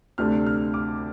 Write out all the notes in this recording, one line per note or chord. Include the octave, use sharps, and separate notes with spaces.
D2 C3 A3 D4 F6
F6
D6